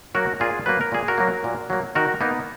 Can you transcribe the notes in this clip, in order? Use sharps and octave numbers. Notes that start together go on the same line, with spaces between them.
F#3 A#3 F#4 A#4
A#2 F4 G#4
F#3 A#3 B4
A#4
A#2 G#4
F#4 A#4
F#3 A#3
A#2
F#3 A#3
D#3 F#4 A#4
A#3 B3 D#4